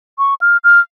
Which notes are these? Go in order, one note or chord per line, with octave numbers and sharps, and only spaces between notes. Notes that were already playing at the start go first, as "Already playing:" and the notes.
C#6
F6
F6